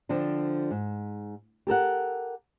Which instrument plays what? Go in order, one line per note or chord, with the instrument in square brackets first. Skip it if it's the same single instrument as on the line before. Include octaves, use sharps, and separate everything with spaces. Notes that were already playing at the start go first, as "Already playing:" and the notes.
[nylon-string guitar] D3 F3 C4 D4
G#2
G4 A4 A#4 F#5